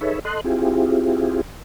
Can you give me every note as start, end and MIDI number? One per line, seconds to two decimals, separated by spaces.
0.01 0.19 63
0.01 0.19 68
0.01 0.19 69
0.01 0.19 71
0.01 0.19 73
0.01 0.19 76
0.25 0.41 69
0.25 0.41 75
0.25 0.41 84
0.25 0.41 90
0.44 1.41 60
0.44 1.41 64
0.44 1.41 65
0.44 1.41 67
0.44 1.41 68